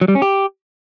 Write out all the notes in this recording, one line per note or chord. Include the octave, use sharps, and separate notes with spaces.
F#3
G3
C#4
G4